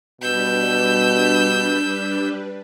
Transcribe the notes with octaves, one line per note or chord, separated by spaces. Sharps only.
B2 G3 D4 B4 E6 G6